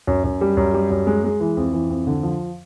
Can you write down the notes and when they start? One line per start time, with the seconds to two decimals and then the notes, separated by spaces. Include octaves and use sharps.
0.07 F#2
0.24 F#2
0.41 G3
0.57 F#2
0.74 G3
0.90 F#2
1.07 G#3
1.24 G#3
1.40 E3
1.57 F2
1.73 E3
1.90 F2
2.07 D3
2.23 F3